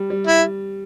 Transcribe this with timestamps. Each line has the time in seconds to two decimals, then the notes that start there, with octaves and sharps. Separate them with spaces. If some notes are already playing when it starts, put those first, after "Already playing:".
Already playing: G3
0.10 G3
0.27 E4